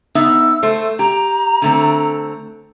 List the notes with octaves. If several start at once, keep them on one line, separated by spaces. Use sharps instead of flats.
B3 D#4 E5 E6
A3 C5
G4 A#5
D3 A3 C4